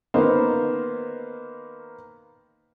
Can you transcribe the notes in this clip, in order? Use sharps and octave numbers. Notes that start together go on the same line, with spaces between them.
D#3 A#3 B3 D#4 C5